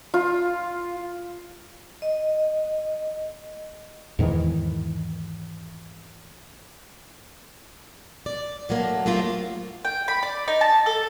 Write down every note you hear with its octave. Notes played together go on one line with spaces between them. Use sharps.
F4
D#5
E2 G#2 D#3 E3
D5
D3 F#3 A3 A#3
F#3 A3 A#3 C4 F4 G4
G5
B5
D5
D#4
A5
A4